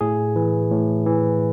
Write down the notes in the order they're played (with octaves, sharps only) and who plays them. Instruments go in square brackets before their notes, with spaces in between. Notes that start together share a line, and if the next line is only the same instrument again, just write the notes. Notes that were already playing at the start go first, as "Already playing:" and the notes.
[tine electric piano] A2 G#4
E3
A2
E3